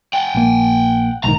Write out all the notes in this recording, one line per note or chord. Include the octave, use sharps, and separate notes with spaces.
F#5 G5
A#1 A#3
B1 G#2 D#3 A#5